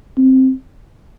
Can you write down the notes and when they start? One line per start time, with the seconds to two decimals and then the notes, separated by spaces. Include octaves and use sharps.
0.18 C4